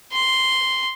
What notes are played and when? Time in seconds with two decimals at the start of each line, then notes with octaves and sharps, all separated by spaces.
0.13 C6